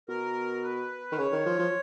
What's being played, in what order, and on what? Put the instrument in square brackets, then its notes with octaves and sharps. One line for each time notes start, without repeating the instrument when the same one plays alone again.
[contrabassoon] B2 [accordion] A#4
[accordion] B4
[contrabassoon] D#3
[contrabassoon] C#3 [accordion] C#5
[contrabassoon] D#3
F3
F3